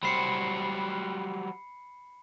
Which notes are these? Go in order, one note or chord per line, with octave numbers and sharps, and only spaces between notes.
F#3 G3 C5 B5 C7 C#7